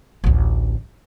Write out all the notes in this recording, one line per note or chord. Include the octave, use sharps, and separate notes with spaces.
A1 D2